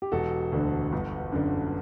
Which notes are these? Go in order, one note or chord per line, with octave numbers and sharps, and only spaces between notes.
G4
E1 F#4 A4
D2 D3
G1
F#2 D3